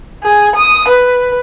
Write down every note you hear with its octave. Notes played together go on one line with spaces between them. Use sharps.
G#4
D#6
B4